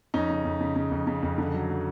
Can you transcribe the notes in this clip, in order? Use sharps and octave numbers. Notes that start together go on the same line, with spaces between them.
F2 C#4 D#4
C#3
F2
C#3
C#3
F2
C#3
F2
D3
F#3
F#3